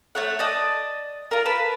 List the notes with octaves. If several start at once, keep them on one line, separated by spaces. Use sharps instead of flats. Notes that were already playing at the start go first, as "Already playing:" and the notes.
A3 C#5 F#5
D5 D#5 A5
F4 A#4
B4 A5